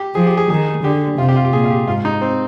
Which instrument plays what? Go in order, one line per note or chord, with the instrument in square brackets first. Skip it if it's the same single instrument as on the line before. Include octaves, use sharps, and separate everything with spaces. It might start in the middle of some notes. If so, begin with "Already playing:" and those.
Already playing: [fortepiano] G4
[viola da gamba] F3 [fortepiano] G#4
[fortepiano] G4
G#4
[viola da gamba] D#3 [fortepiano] G#4
[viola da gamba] D3 [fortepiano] G4
[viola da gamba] C3 [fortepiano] F4
[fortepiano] G4
F4
G4
[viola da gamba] A#2 [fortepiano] G#4
[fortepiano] F4
G4
[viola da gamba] G#2 [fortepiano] F4
[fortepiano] D#4
C4